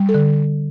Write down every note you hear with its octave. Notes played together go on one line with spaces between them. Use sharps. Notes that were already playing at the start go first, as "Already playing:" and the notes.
Already playing: G3
A4
D3